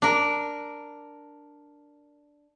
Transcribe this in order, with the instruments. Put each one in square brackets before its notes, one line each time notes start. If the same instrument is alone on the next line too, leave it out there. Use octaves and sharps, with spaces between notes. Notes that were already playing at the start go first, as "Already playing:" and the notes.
[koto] D4 A#4